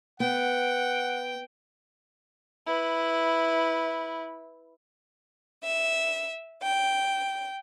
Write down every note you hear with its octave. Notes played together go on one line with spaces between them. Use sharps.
B3 F#5 G5
E4 B4
E5
G5